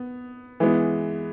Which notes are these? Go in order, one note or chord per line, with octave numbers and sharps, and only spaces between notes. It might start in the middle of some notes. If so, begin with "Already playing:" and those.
Already playing: B3
E3 G#3 B3